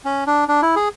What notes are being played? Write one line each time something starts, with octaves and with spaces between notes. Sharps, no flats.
C#4
D4
D4
E4
G#4